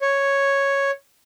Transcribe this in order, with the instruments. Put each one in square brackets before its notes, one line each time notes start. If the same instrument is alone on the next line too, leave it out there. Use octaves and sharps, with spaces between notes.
[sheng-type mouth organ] C#5